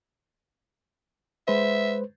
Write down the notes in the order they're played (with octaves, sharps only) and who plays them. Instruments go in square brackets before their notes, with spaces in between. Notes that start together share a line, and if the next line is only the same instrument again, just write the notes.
[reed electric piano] G#3 B4 C5 [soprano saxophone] E5